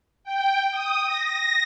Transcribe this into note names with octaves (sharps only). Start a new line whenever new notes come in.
G5
D#6
A#6